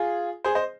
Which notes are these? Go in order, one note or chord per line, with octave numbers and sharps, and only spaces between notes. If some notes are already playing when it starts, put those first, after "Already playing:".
Already playing: F4 G#4
G#4 C5
C5 D#5